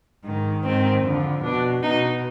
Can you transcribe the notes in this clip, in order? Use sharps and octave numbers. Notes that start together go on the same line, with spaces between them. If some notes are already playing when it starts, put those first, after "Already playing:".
G#2 D#3
G#2 D#3 C4
F2 D3 F3
B2 D4
B2 D#4